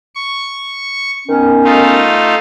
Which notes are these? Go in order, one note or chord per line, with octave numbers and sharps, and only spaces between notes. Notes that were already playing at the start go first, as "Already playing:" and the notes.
C#6
D#3 B3 C#4
A3 D#4 F4